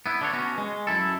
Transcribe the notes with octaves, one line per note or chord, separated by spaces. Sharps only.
B3 E4
D3 D4 C#5
B3 C#4 F#4
G#3
F#2 E4 A4